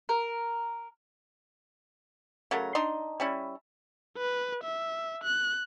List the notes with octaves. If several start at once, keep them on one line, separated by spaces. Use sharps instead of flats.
A#4
C#3 F#3 A3 A#4
D4 D#4 C6
G3 C#4 E4
B4
E5
F#6